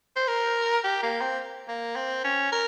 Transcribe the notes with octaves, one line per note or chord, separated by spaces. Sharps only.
C5
A#4
G4
A#3
C4
A#3
C4
C#4
A#4